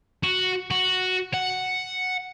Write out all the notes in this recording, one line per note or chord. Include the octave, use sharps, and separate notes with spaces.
F#4
F#4
F#5